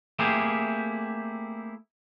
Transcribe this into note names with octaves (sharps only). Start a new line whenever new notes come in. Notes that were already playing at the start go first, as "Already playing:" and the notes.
A3 A#3 C4 E4 G4 G#4